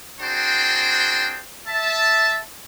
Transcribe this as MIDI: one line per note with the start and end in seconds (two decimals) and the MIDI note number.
0.20 1.40 60
0.20 1.40 62
0.20 1.40 66
0.20 1.40 68
0.20 1.40 72
0.20 1.40 79
1.67 2.40 76
1.67 2.40 81